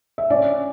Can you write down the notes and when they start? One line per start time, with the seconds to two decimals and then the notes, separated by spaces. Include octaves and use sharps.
0.18 E5
0.30 C#4 D5